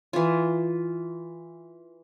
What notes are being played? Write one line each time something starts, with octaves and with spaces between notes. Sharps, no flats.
E3 F4